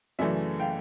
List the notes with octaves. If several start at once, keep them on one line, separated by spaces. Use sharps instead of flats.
F#2 C#3 E3 A3 D5 E5
F5 G5